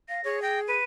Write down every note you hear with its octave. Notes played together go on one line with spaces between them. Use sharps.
F5 A#6
G#4 C#5
G5 A#6
B4 D#7